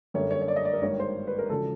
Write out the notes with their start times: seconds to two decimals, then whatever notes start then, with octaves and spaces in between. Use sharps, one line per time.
0.14 F#2 D3 G3 A#3 C#5
0.31 C#5
0.41 C#5
0.48 D5
0.56 D#5
0.65 D5
0.73 A#4
0.81 G#1 G2 D#3 G3 A#3 C#5
0.99 C5
1.27 B4
1.38 A#4
1.49 E1 C#3 F3 A4